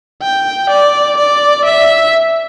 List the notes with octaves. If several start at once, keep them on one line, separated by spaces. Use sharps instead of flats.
G5
D5
D5
E5